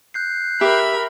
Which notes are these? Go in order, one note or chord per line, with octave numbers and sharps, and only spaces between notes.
F#6 G6 C7
G4 A#4 E5 B5